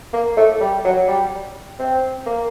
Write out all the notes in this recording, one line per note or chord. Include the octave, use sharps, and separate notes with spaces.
A#3
A3
G3
F#3
G3
C4
A#3